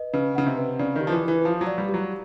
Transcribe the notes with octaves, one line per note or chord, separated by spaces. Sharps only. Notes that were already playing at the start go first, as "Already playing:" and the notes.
Already playing: B4 D#5
C#3 B4
C#3 F#5
C3
B4
C#3 D5
D#3 G4
F3
E3
E3 B4
F3 F5
F#3
D5
G3
G4
F#3